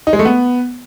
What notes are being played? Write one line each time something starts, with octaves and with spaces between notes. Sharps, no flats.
D#4
G#3
A3
B3